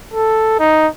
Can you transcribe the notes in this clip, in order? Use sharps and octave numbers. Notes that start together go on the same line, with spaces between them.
A4
D#4